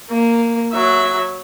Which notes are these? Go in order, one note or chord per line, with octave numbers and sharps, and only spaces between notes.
A#3
F#3 E5